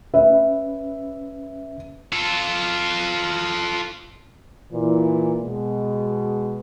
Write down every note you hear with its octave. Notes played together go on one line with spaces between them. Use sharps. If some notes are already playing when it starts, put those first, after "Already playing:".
C#4 B4 E5
F4 A4
A#2 E3
B2 G#3